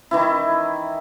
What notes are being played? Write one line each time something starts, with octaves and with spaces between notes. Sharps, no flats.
D#3 E3 E4